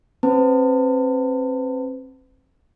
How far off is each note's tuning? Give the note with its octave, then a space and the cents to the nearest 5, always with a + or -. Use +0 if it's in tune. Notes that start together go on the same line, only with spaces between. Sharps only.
C4 +35 B4 +40 A5 +30